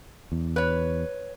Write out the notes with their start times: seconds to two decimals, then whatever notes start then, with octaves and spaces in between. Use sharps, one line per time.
0.32 E2
0.56 B4 C#5